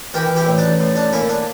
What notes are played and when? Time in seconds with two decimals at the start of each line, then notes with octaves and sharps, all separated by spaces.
0.14 E3 G4 A#4
0.36 E4 G4
0.47 A1
0.58 D4
0.80 A2
0.96 D4
1.13 A#3 C#4 E4
1.29 D4